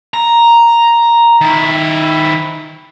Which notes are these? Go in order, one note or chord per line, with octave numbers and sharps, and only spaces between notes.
A#5
D#3 E4